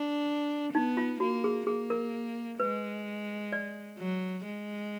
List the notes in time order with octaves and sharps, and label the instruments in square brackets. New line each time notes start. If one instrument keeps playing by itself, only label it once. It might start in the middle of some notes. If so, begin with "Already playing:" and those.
Already playing: [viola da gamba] D4
[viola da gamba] B3 [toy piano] D#4
[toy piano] F4
[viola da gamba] A#3 [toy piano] F#4
[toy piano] G#4
[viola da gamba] A#3 [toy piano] G#4
[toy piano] A#4
[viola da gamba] G#3 [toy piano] B4
[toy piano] D5
[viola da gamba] F#3
G#3